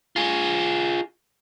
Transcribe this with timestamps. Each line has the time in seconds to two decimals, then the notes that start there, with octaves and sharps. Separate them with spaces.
0.16 F4 G#4